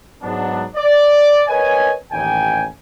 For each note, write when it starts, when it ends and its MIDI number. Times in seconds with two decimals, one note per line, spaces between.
0.23 0.65 44
0.23 0.65 54
0.23 0.65 59
0.23 0.65 62
0.76 1.43 74
1.48 1.92 70
1.48 1.92 71
1.48 1.92 73
1.48 1.92 75
1.48 1.92 80
2.12 2.65 33
2.12 2.65 39
2.12 2.65 79
2.12 2.65 80